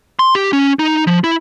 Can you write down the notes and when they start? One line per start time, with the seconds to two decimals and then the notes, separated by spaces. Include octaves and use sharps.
0.19 C6
0.35 G4
0.53 C#4
0.79 D#4
1.07 F3
1.24 E4